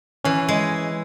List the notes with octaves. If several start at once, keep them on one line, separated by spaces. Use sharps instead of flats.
E3 C#4
G#3